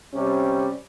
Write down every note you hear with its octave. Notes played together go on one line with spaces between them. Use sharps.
C3 G3 C#4